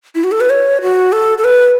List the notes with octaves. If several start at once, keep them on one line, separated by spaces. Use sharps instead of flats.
E4
F#4
A4
B4
C#5
F#4
A4
A4
B4